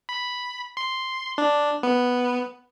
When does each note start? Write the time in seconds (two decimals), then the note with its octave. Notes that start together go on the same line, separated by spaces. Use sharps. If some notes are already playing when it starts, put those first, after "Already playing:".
0.09 B5
0.77 C6
1.38 D4
1.83 B3